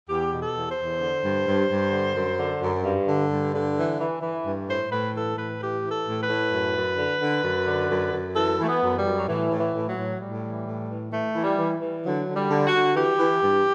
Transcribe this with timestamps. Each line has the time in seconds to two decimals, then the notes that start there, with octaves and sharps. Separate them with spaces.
0.09 E2 G4
0.32 B2
0.40 A4
0.55 E2
0.70 C5
0.77 E2
1.00 D3
1.23 G2
1.47 G2
1.70 G2
1.92 D3
2.15 F#2
2.38 D3
2.61 F#2
2.84 G2
3.08 D3
3.31 G2
3.53 D3
3.76 E3
3.99 E3
4.22 E3
4.46 G2
4.68 A2 C5
4.91 A2 B4
5.14 E3 A4
5.37 A2 B4
5.60 E3 G4
5.84 E3
5.91 A4
6.06 A2
6.22 B4
6.29 A2
6.53 F#2
6.76 F#2
6.98 D3
7.21 D3
7.44 F#2
7.67 D3
7.90 F#2
8.13 F#2
8.35 E3 A4
8.59 E3 A3
8.67 B3
8.82 F#2
8.97 G3
9.05 F#2
9.18 F#3
9.28 A2 E3
9.51 A2
9.59 E3
9.74 A2
9.89 F#3
9.96 A2
10.20 A2 G3
10.43 E3
10.66 A2
10.89 E3
11.12 E3 A3
11.35 E3
11.43 G3
11.58 E3
11.81 E3
12.03 D3 F#3
12.27 D3
12.35 G3
12.50 D3
12.66 F#4
12.73 D3
12.96 E3 G4
13.19 E3
13.42 G2